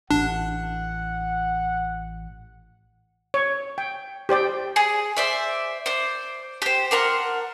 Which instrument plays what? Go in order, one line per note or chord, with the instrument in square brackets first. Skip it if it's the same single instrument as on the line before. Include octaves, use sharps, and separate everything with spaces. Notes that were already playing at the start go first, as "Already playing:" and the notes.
[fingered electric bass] A1 [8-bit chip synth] D4 [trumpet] F#5
[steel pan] C#5
G5
G4 C5 D5 G5
[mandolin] G#4
C5 D5 E5
C5 D5
G4 C5
D4 A#4 F#5 C6